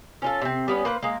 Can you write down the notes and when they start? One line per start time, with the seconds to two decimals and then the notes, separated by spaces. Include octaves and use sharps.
0.22 C#4 F4 A4
0.42 C3 C4
0.68 G3 B3 C#4
0.85 A#3 B4 C5
1.03 G#3 A#3